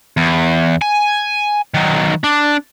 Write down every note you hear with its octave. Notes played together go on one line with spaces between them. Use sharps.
E2
G#5
D#3 F#3
D4